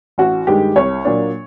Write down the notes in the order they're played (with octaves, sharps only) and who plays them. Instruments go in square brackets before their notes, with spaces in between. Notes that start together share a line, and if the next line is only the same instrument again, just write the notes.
[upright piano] A1 F#4
G2 D#3 G#3 G4
C2 C#5
A#2 F#3 A#3 D4